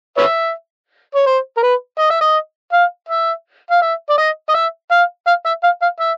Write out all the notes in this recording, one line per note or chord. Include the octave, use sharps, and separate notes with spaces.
B4 C#5 E5
C#5
C5
A#4
B4
D#5
E5
D#5
F5
E5
F5
E5
D5
D#5
D#5
E5
F5
F5
E5
F5
F5
E5